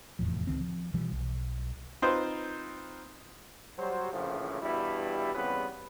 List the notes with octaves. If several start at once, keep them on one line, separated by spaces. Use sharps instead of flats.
F1 E2 A2 F3
C#2 D#3 C4
F3
B2 E3 F3 G3
B1
C4 D#4 F4 B4 C5
F#3 G3 C5
A#1 A2 C#3 E3 F3
E2 G2 B2 G3 E4
E2 C#3 G3 B3 C4 B4